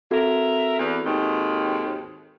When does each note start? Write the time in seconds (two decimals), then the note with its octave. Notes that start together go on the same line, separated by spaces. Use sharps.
0.11 C4 F#4 A4 A#4 E5
0.79 E2
1.04 D#2 G#2 D#3